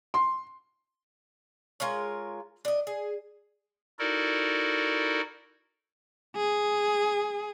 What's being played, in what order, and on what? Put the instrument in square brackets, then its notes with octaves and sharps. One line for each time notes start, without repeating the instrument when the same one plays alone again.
[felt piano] C6
[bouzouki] G#3 F4 A#4 C#5
D4 D#5
G#4
[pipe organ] D#4 E4 F#4 A4 A#4 D5
[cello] G#4